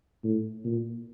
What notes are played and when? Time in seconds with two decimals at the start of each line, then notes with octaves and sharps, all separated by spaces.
0.24 A2
0.64 A#2